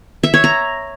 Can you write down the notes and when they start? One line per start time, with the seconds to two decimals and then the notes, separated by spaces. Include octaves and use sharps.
0.24 E5
0.34 C#5
0.44 A#5